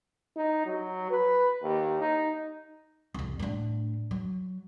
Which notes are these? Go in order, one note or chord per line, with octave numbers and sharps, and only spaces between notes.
D#4
F#3
B4
D#2
D#4
C2 F2
A2 D4
F#3